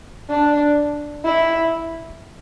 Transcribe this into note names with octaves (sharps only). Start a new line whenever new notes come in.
D4
E4